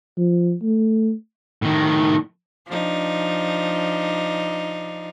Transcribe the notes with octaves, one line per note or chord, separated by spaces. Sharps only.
F3
A3
A2 D#3
F3 D4 D#4